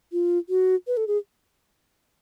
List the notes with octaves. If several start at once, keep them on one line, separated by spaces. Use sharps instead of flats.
F4
F#4
B4
A4
G#4